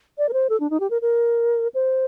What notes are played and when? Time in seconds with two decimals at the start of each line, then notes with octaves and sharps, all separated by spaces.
0.18 D5
0.29 A#4
0.33 C5
0.49 A4
0.60 D4
0.70 D#4
0.80 G4
0.90 A#4
1.02 A#4
1.74 C5